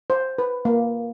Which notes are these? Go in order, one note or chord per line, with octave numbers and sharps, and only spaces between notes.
C5
B4
A#3